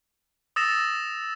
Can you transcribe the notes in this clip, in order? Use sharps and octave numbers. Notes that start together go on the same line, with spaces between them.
D#6 E6 A6 A#6 E7